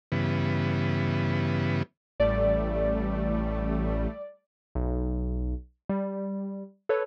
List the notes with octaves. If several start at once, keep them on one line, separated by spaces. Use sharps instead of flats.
G2 C#3 E3 B3
A1 G3 A3 D5
B1
G3
A4 B4 C#5